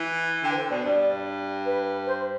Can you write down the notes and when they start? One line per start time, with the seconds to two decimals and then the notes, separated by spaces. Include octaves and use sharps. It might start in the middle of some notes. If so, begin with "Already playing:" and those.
Already playing: E3
0.43 D3 G5
0.51 B4
0.56 C5
0.70 B2 D5
0.84 G2 D5
1.65 B4
2.06 C5